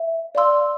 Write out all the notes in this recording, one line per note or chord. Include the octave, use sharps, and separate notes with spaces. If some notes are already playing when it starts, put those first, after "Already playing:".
Already playing: E5
D5 F5 C6 E6